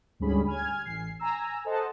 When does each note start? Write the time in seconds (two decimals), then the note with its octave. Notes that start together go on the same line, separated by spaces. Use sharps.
0.20 D2 G#2 G3 C#4 G#4 B5
0.46 G#5 F6 G#6
0.85 A1 C7
1.19 G#5 A#5 E6
1.65 A4 C5 D#5 F#5 A5